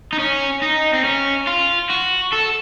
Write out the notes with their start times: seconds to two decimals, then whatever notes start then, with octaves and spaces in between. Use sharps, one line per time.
0.13 D#4
0.19 C#4
0.62 D#4
0.94 C4
1.04 C#4
1.47 F4
1.90 F#4
2.33 A4